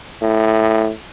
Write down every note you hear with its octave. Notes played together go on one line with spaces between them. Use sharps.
A2